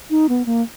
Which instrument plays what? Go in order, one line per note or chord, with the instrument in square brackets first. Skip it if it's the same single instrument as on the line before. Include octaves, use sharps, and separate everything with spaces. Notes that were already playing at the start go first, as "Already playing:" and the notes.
[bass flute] D#4
B3
A#3